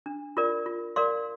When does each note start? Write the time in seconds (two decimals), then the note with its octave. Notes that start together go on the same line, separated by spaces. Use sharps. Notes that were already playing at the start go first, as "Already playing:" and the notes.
0.06 D4
0.37 F4 A#4 D5
0.66 F4
0.96 A#4 D5 F5 C6